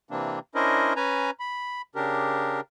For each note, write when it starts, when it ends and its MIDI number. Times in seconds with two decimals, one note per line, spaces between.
0.11 0.39 48
0.11 0.39 52
0.11 0.39 58
0.11 0.39 60
0.11 0.39 62
0.55 0.93 61
0.55 0.93 62
0.55 0.93 64
0.55 0.93 70
0.55 0.93 72
0.55 0.93 75
0.96 1.31 61
0.96 1.31 71
0.96 1.31 80
0.96 1.31 82
1.40 1.82 83
1.95 2.61 49
1.95 2.61 62
1.95 2.61 67
1.95 2.61 70